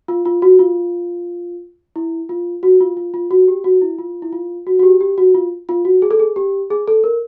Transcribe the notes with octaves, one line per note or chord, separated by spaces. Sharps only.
F4
F4
F#4
F4
E4
F4
F#4
F4
F4
F4
F#4
G4
F#4
E4
F4
E4
F4
F#4
F#4
G4
G4
F#4
F4
F4
F#4
G#4
A4
G#4
G4
G#4
A4
A#4